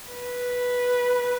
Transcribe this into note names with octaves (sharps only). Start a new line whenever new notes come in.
B4